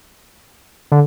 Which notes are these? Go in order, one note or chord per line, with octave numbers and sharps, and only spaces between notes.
D3